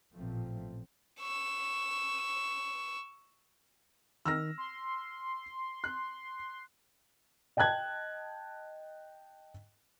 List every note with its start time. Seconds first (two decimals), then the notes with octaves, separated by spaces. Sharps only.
0.13 A1 A#2 F3 A3 C4
1.21 C#6 E6
4.26 D#3 E6 F6 A#6
4.58 C6
5.84 F#6
7.57 D#5 G5 A5 F#6 G#6